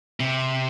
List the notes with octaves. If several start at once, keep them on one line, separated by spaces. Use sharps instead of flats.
C3